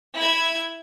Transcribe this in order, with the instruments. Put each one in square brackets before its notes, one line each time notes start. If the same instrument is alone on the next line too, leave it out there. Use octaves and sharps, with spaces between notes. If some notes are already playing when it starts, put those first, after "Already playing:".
[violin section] E4 G#6